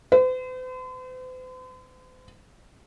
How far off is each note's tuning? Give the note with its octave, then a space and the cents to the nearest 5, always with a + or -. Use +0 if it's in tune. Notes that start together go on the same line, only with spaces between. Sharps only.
C5 -45